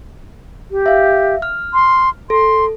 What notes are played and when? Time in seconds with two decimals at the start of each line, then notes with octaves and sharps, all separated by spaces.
0.71 G4
0.86 E5 F5
1.42 F6
1.74 C6
2.30 A4 C6